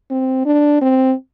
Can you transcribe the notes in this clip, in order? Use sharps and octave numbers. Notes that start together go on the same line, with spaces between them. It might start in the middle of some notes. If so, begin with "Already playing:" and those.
C4
D4
C4